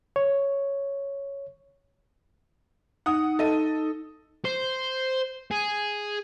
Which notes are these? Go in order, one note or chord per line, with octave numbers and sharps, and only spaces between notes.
C#5
D#4 F#5 D#6
A4 D#5 D#7
C5
G#4